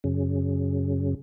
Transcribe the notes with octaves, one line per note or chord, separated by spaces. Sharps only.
F#2 C#3